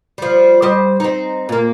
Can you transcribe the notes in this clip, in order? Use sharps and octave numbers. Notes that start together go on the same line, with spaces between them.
F3 G3
G3 C5 D#5
C4 D#4
A#2 A#3